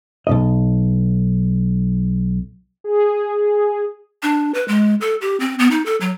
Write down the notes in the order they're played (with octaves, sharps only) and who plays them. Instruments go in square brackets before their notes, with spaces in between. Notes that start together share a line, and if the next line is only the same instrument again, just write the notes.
[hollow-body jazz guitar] B1 G#2 D#5
[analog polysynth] G#4
[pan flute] D4
B4
G#3
A4
G4
C4
B3
D#4
A4
F#3